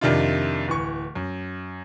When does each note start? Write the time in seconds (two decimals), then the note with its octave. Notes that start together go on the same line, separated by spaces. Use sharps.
0.01 F2 C3 D#3 D4 E4 F4
0.68 D1 E3 C#6
1.15 F#2